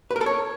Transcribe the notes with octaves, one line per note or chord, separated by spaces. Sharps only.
B4
A#4
A4
C#5